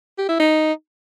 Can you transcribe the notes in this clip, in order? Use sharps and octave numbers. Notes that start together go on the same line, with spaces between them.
G4
E4
D#4